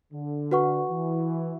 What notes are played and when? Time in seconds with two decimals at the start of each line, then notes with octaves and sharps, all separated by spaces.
0.13 D3
0.51 F#4 B4 F#5 C#6
0.90 E3